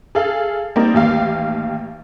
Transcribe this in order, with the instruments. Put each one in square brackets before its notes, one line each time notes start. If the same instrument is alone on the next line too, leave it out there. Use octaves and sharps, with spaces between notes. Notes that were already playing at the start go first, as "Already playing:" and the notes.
[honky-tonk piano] G#4 A4 F5
G3 A#3 C4 D#4 A#4 D5
A1 D#2 G4 F5